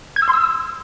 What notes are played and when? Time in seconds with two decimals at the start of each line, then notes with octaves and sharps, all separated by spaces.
0.16 G#6
0.22 E6
0.28 C6
0.33 E6